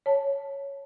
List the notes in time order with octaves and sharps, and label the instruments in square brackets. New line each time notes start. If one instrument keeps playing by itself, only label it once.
[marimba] C#5 A5